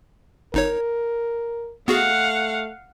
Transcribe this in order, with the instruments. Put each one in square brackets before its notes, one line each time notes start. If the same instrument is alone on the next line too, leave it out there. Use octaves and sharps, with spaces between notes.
[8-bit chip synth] G1 D#4 C#5 [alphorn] A#4
[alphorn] A3 [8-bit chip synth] B3 F#4 G#4 [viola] F5 F#5